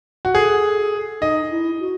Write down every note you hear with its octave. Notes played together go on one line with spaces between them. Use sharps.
F#4
G#4 A4
D#4 D#5
E4
F#4